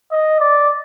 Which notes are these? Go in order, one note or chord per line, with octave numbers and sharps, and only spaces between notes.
D#5
D5